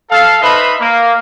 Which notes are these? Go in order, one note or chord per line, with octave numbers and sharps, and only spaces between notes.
A4 F5
D#4 B4 C5 D#5 E5 B5
A#3